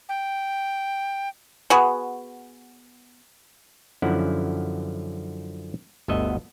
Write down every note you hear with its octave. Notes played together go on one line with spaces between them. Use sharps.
G5
B3 F#4 G#4
F#2 D3 F3 C#4 E4 F#5
G1 D2 B3 A4 D#5 E5